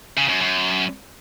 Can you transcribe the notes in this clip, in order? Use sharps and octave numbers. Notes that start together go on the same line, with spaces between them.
C#3
F#2
F#2